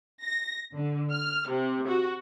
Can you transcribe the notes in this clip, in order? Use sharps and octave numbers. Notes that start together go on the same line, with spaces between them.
A#6
D3
F6
C3
F#4